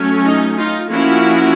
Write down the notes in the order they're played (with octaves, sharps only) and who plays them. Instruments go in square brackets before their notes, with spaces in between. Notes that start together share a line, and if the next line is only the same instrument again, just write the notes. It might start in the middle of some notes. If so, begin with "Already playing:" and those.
Already playing: [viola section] F#3 A3 C#4
D#4
D#4 F4
F3 A#3 C#4 E4 F#4